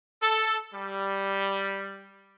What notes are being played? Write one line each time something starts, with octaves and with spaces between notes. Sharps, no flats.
A4
G3